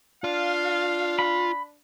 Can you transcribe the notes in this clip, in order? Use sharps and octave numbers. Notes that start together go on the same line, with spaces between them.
D4 F4 F5
B5